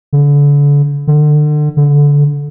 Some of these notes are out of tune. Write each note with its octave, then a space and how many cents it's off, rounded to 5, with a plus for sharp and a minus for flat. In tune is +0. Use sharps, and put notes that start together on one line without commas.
D3 -35
D3 +30
D3 -20